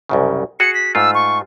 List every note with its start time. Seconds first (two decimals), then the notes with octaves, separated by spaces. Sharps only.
0.09 C2 F#2 C#3
0.60 F#4 G#4 F#5 C#7
0.74 B6
0.95 G#2 A3 F4 E6
1.14 C#6